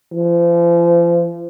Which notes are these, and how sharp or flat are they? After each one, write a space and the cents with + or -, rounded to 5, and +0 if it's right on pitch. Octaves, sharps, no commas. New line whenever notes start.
F3 -35